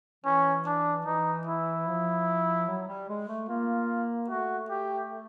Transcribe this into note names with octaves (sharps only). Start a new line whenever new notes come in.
E3 C#4
D4
E3 D#4
E4
F3
F#3
G3
G#3
A3
A#3 F4
A3 F#4
G4